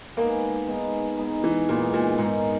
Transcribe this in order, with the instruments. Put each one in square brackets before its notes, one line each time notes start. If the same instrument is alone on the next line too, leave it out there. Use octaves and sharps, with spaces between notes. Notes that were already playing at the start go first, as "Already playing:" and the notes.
[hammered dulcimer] G#3 B3 D#4 G#4 [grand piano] A#3
[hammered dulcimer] G#3 B3 D#4 G#4
G#3 B3 D#4 G#4
[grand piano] E3
[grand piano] A#2 [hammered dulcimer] G#3 B3 D#4 G#4
[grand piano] A#2
[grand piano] G#2 [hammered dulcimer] D#3 G#3 D#4